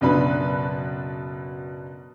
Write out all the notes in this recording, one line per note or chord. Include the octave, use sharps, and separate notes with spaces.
F#1 B2 F#3 D4 B4 B5